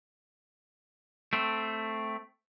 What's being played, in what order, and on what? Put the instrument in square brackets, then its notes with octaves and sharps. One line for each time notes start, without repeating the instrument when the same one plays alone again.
[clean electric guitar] A3 C4